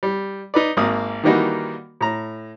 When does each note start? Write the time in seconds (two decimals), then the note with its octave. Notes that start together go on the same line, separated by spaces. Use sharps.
0.03 G3
0.54 D#4 B4 D5
0.77 G#1 A#3 D#6
1.23 D#3 E3 G3 A#3 D#4 F#4
2.01 A2 A#5